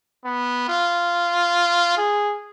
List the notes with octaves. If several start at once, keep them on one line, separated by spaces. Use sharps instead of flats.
B3
F4
G#4